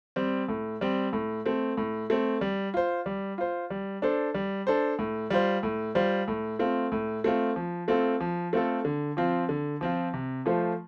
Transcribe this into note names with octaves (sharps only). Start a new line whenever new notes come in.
G3 C4
A2
G3 C4
A2
A3 C4
A2
A3 C4
G3
F4 C5
G3
F4 C5
G3
D4 A4 C5
G3
D4 A4 C5
A2
G3 F4 C5
A2
G3 F4 C5
A2
A3 C4 F4
A2
A3 C4 F4
F3
A3 C4 F4 A4
F3
A3 C4 F4 A4
D3
F3 C4 F4
D3
F3 C4 F4
C3
F3 A3 F4 C5